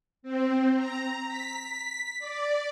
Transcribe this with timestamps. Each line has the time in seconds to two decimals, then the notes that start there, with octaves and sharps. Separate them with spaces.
0.23 C4
0.75 A#5
1.27 B6
2.19 D5